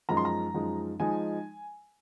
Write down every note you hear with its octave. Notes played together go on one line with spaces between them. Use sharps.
F#2 F3 G#3 D#4 A#5
C6
A#5
F#2 F3 G#3 D#4
F3 G#3 D#4 G#5